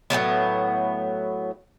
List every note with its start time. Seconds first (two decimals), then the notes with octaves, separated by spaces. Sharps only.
0.10 A2 C3 F#3 B3